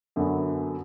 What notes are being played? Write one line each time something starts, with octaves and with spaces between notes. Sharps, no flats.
F#2 D3 F#3 B3